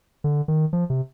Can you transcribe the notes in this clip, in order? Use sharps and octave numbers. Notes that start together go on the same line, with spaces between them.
D3
D#3
F3
C3